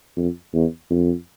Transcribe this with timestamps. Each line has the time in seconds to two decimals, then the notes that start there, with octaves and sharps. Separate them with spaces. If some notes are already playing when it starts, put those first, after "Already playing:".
0.17 F2
0.54 E2
0.90 F2